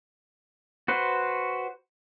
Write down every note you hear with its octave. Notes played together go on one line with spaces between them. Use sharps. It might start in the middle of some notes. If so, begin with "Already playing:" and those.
F#4 B4 C5